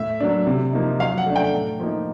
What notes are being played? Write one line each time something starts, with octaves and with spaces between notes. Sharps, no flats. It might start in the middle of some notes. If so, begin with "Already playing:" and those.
Already playing: A2 E5
F#3 A#3 D4
C3
F3 A#3 D#4
F#3 F5
F#5
A3 D4
G5
A2
F3 A#3 D#4